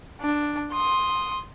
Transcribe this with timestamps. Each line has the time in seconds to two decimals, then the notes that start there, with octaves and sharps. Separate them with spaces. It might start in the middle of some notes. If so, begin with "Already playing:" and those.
0.21 D4
0.72 C6 D#6